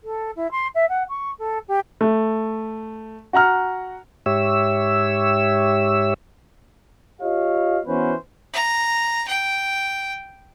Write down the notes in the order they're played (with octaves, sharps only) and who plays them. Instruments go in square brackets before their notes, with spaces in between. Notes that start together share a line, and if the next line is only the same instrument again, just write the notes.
[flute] A4
E4
C6
E5
F#5
C#6
A4
G4
[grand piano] A3
F#4 F#5 A#5 F6
[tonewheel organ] G#2 G4 C#5 E5 E6
[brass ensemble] F4 G4 C#5 D#5 F5
E3 B3 C#4 F#4 B4 C5
[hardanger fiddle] A#5
G5